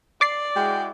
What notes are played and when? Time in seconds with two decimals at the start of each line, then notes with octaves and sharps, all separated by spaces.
0.21 D5 D6 A6 C7
0.55 G#3 E4 F#4 G5